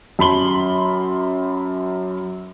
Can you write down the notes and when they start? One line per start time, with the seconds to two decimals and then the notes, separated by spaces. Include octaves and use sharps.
0.19 F#2 A5 B5 C6 F#7 G7